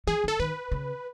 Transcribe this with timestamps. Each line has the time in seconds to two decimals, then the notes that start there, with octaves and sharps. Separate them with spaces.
0.07 E3 G#4
0.24 D#3
0.28 A4
0.40 D#3 B4
0.71 C#3